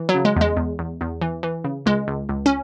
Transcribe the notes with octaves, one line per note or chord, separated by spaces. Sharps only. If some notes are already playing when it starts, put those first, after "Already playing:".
Already playing: E3
F#3
C#3
G#3
E2 G#3
E2
E2
E2
E3
E3
C#3
C#2 G#3
C#2
C#2
C#4